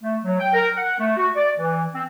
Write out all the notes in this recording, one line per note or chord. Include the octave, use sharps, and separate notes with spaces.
A3
F#3
G5
A#4
F#5
A3
F#4
D5
E3
C4